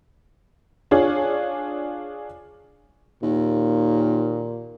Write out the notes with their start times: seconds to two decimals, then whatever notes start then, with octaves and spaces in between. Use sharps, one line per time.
0.91 D4 F4 G#4 C#5
3.23 D#2 A#2